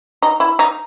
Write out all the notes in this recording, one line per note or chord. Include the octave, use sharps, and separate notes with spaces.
D#4
E4
D#4